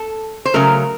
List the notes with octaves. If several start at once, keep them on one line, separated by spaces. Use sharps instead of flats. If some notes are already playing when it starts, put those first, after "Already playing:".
Already playing: A4
C5
C#3 F#3 A3 A#4